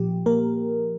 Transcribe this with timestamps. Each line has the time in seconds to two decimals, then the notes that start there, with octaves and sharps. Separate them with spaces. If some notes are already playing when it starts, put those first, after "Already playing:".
Already playing: A#2 F3 G4
0.26 A#3 A#4